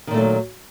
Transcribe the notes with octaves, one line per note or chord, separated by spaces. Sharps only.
A#2 D#3 F#3 A3